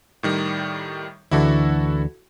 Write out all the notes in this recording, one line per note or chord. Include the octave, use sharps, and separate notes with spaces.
A2 D#3 G3
D2 D3 E3 E4 F#4 A4